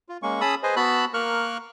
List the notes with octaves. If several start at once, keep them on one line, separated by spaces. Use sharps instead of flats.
F4
G#3 A#3 C#4 C#6
C#4 G#4 A5 B5 D#6 E6
G#4 B4 C5 D#5 G#5
B3 F#4 A5 B5 E6 F#6
A#3 A#4 C#6 F6 F#6